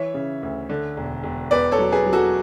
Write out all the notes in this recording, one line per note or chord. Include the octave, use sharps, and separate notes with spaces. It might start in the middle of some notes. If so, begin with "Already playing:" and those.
Already playing: E3 C#5 E5
C#3
D2
D3
E1
E1
E2 B4 D5
A4 C#5
F#3
G#4 B4
F#3
F#4 A4